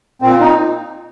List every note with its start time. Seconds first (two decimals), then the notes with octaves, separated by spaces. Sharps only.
0.22 A#2 C4
0.41 D#4